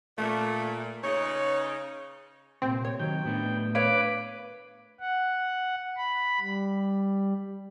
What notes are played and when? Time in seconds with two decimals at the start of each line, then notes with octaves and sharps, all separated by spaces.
0.18 A#2 A3
1.03 C#3 D#4 C#5
2.62 C2 A#2 C4
2.85 C#5
3.00 D#3 F#3 G5
3.25 A2 B3 D4
3.75 B4 C#5 F5 D6
5.00 F#5
5.97 B5
6.40 G3